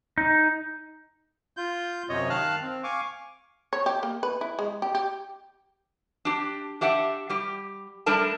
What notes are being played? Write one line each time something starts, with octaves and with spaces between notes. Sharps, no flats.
D#4
F4 G6
F#2 C3 C#5 D#5
D#3 F5 A5 F6 F#6
C4
F5 G#5 C#6 D6
C#5
G4
A#3
B4
E4
G#3
G4
G4
D4 G4
D4 G4 E5 F#5
G3 G4
G3 A3 D4 A#4 A5